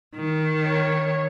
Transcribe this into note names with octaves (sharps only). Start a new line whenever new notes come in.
D#3
C#5